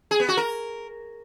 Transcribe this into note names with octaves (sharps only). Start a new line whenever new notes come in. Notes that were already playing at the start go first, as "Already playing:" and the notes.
G#4
B3
F#4
A#4